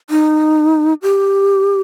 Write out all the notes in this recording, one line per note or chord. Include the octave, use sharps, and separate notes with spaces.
D#4
G4